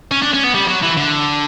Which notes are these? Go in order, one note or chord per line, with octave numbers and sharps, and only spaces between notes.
C#4
D4
C#4
B3
G3
F#3
E3
D3